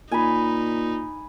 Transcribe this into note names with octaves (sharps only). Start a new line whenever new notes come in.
A#2 D#4 G#5 B5